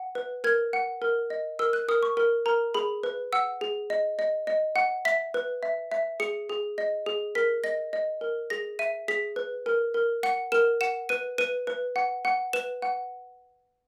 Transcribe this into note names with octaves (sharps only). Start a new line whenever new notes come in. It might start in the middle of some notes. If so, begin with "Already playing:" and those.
Already playing: F#5
B4
A#4 G#6
F#5
A#4
D#5
A#4 E6
F#6
A#4 D#6
C#6
A#4
A#4 A#5
G#4 B5
B4
F#5 E6
G#4
D#5
D#5
D#5
F#5
E5 B6
B4
E5
E5
G#4 C#7
G#4
D#5
G#4
A#4 B6
D#5 A#6
D#5
A#4
G#4 A#6
E5 D#7
G#4 B6
B4
A#4
A#4
F#5 C#7
A#4 E7
F#5 E7
B4 D#7
B4 D#7
B4
F#5
F#5
B4 E7
F#5